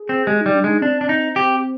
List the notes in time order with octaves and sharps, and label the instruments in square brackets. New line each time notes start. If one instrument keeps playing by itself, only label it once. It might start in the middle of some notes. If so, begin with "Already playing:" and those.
Already playing: [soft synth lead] G#4
[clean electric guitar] C4
[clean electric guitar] G#3 [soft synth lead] G4
[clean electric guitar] G3 [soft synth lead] D#4
[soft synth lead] D4
[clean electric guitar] G#3 [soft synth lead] D#4
[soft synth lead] C4 [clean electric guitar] D4
[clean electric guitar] D4
D#4
[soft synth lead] C4 [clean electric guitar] G4